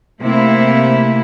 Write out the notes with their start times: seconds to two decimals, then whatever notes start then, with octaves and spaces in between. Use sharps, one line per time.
0.21 C3 A3 A#3 E4